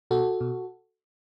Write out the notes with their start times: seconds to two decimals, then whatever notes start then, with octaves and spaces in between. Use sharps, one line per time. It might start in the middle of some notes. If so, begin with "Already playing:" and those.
0.11 B2 F#4 A4
0.41 B2